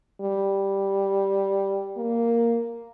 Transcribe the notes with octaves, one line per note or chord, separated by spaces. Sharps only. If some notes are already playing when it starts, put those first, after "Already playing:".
G3
A#3